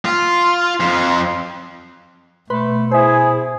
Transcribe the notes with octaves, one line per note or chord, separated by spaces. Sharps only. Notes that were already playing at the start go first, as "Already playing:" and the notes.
F4
F2 F4
B2 A3 B4 B5 C6
E4 G#4 C5 E5